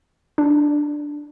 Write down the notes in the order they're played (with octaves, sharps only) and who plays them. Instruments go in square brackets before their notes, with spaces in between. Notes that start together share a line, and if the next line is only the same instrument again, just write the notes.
[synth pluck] D4